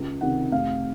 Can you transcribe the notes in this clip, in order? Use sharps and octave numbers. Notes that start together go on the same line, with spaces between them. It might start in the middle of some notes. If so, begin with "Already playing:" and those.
Already playing: C#2
C3 D#3 F#5
F1 F5